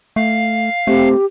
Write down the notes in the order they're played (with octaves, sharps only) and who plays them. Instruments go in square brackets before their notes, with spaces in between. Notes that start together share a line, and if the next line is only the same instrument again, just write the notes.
[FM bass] A3 [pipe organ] F5
[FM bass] A3 [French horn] C4 [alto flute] G4